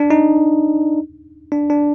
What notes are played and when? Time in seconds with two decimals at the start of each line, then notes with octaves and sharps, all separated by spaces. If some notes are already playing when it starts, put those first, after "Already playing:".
Already playing: D4
0.10 D#4
1.52 D4
1.70 D4